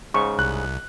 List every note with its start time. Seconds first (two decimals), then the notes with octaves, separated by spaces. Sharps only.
0.14 G#2 C#3 C#6
0.39 C2 F#6